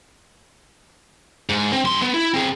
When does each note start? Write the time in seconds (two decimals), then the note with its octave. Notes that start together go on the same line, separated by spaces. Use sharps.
1.49 G#2
1.73 C4
1.85 G2 C6
2.02 B3
2.14 E4
2.34 C4 G#4